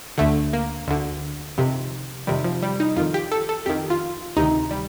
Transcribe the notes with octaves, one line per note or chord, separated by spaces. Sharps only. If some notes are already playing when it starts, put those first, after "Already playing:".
D2 D3 A3
A#3
D2 D3
F2 C3 D#3
F2 C3 D#3 G3
F3
G3
D#4
F2 D#3 F4
G4
A4
A4
F2 D#3 G4
F4
D2 C3 D#3 D#4
G3